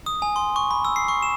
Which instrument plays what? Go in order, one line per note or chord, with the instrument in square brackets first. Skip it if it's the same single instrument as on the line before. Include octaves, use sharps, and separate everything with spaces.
[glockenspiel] D#6
G#5
C6
C#6
B5
E6
C7
C#6
E7